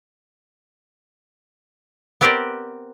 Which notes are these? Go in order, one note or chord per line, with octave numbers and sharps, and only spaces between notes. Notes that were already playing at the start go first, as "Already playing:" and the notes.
B3 C4 G4 A#4 C5 D5